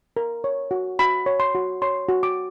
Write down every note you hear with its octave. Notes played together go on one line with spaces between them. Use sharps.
A#4
C#5
F#4
F#4 B5
C#5
C6
F#4
C#5 C6
F#4
D6